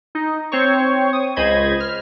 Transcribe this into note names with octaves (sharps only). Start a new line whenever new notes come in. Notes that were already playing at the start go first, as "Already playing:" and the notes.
D#4
C4 C5 C#5 C#6
D#6
C#2 C5 D#5 B5 G#6
F6